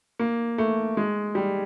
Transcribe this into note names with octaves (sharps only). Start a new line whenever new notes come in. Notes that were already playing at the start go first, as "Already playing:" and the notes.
A#3
A3
G#3
G3